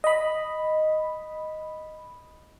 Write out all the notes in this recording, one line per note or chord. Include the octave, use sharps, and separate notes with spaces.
D#5 B5